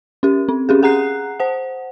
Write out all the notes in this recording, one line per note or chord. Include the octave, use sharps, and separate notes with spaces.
C#4 G4
C4
C#4 G4 G#4
G#4 F#5 A#5 F#6 C7
C5 F#5